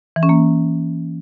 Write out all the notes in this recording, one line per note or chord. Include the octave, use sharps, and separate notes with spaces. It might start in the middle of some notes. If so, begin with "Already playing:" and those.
E3
C#4
A#3